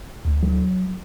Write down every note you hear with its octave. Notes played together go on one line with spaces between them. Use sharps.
D2
F#3